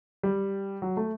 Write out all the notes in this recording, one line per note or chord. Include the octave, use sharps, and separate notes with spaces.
G3
F#3
A3